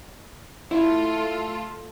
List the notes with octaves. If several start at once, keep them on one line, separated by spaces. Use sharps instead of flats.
A3 E4 F4 A4